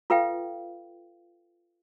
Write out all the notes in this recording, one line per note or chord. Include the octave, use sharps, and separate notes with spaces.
F4 A4 B4 F5 G5